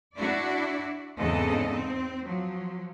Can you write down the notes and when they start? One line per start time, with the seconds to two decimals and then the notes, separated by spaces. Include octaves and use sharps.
0.15 D4 E4 F#4 D5
1.18 E2 G#2 C#3 C4 A4 D#5
1.72 C4
2.24 F3 F#3